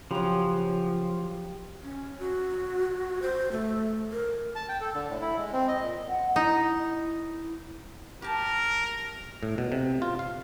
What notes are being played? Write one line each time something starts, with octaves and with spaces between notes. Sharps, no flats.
C#3 F3 F#3 G4
C#4
F#4
C5
A3
A#4
A5
G5
A4
D3
A2
E4
G#3
C4
D#5
A#2
F#5
D#4 E4
G4 A#4 A5
A2
B2
C3
F4
F5